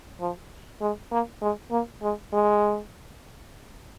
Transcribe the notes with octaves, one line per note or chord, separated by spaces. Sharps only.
F3
G#3
A#3
G#3
A#3
G#3
G#3